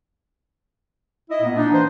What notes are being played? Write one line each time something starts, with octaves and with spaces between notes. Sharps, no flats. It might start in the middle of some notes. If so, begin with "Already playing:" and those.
E4 D#5
A#2 A#3 B3
D4 D#4
E3 C5